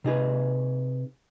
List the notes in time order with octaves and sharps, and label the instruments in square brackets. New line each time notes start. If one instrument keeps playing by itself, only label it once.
[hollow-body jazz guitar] C3 D#4 G#4 B4